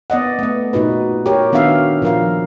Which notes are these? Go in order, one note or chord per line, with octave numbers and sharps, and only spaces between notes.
B3 D5 D#5 F#5
A3 B3
A#2 D#4 F#4 B4
G4 A#4 C#5
D#3 B3 D4 F#4 E5 F5
A#2 F3 A#4 F5